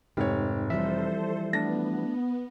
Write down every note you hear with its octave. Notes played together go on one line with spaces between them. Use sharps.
F1 G#2 G4 C#5
E3 F3 G3 A4 C5 E5
A3 B3 D4 A#6